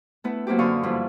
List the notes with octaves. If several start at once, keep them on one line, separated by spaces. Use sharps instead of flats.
A3 B3 E4
F#3 A#3 C4 E4 G4
F#2 D3 F5 C#6 D#6
G2 F3 A#3 E4